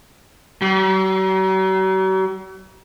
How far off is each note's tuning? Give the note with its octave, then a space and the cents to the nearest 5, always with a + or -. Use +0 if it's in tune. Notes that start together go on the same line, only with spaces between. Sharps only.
F#3 +45